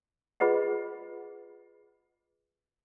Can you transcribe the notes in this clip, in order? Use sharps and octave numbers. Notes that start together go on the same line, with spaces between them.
F4 G#4 B4 D#5 F#5